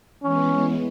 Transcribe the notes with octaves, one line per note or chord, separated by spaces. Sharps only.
E3 G#3 B3 C#4